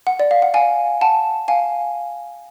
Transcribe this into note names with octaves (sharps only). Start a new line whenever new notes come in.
F#5
D5
F5
F#5
F5 G#5
F#5 A5
F5 G#5